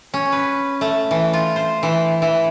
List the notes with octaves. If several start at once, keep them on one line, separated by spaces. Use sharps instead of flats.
C#4
B4
A3
E3
F4
C5
E3
E3